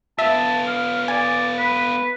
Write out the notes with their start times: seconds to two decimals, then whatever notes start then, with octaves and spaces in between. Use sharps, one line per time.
0.19 B3 F4 E5 A5
0.67 F5
1.08 D5 G#5
1.59 B4